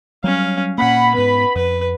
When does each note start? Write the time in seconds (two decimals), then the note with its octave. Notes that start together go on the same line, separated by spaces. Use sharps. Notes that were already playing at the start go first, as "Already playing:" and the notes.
0.24 F#3 G3 C#4 F5
0.78 A#2 A#3 C#4 F#5 B5
1.15 G#2 B3 B4
1.55 F2 B4